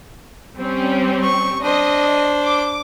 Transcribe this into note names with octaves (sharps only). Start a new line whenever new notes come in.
G3 C4 C#4
C#6
D4 C5 D#5
D6